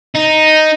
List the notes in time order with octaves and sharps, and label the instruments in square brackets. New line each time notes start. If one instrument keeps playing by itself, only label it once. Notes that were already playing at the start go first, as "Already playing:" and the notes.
[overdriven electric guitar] D#4